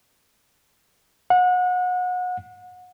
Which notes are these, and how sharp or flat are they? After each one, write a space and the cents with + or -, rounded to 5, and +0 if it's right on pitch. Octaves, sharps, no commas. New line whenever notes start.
F#5 -30